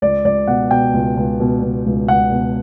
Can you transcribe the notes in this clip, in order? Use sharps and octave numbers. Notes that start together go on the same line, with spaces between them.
C#2 D5
C#2 D5
B2 F#5
B2 G5
C#2
C#2
B2
B2
C#2
C#2 F#5
B2